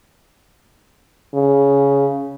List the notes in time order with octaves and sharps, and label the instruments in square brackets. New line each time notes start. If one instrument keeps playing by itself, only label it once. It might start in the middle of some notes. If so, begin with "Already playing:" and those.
[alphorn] C#3